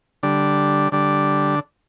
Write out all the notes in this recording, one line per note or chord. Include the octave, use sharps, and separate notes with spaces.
D3 G3 D4
D3 G3 D4